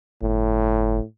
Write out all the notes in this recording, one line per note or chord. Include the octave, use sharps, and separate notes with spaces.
G1 A2